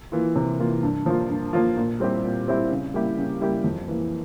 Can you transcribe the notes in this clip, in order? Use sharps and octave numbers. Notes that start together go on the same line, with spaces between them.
E3 A#3 F4
C3
E3 A#3 F4
G2
F3 A#3 F4
G2
F3 A#3 F4
A#2
G3 C4 E4 G4
A#2
G3 C4 E4 G4
C#3
G3 A#3 E4 G4
C#3
G3 A#3 E4 G4
F2
E3 A#3